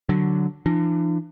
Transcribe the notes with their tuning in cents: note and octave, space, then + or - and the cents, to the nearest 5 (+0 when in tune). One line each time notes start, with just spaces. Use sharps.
D3 +0 F#3 +0
E3 +45 D4 +35